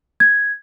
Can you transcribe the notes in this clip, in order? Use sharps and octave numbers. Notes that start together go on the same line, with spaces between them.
G#6